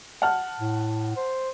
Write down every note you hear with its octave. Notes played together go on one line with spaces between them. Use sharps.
F#5 A5 F6
A2
C5